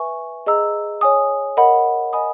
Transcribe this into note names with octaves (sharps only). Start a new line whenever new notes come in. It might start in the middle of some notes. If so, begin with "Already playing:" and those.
Already playing: B4 E5 G#5 C#6
G#4 D#5 A#5 E6
C#5 G#5 D#6
A#4 D#5 F#5 B5
D#5 G#5 B5 D#6